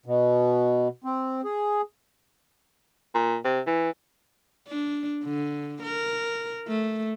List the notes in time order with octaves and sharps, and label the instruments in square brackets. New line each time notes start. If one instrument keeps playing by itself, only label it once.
[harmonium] B2
C4
G#4
[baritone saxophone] A#2
C3
E3
[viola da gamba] D4
D3
A#4
A3